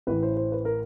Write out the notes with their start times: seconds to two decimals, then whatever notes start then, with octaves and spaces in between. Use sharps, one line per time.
0.07 A1 A2 E3 B4
0.23 C5
0.37 C5
0.52 B4
0.65 A#4